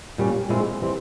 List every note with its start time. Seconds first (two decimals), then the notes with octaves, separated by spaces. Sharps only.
0.18 A#2 G3 C#4
0.49 A#2 G#3 C4 E4
0.82 E3 G3 C4